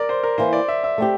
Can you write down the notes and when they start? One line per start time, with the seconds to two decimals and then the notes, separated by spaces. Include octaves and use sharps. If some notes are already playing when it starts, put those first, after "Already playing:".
Already playing: A#4 D5
0.09 C5
0.23 A#4
0.38 E3 A#3 E4 C5
0.53 D5
0.68 E5
0.84 E5
0.98 A3 C4 G4